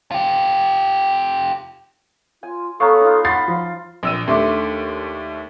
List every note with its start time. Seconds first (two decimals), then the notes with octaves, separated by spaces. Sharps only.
0.11 F4 G4
2.43 F4 G#5
2.80 B3 A4 C#5 F5 A#5 C#6
3.01 D#4 F4
3.25 F#5 B5 C6 A6 C7
3.48 F3 F4
4.03 A#1 E6 D#7
4.27 D#2 A3 D4 E5 C6 D6